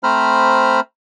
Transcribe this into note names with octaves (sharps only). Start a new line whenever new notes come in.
A3 C4 C5 A#5 B5 F6